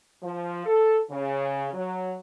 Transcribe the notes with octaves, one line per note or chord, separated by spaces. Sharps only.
F3
A4
C#3
F#3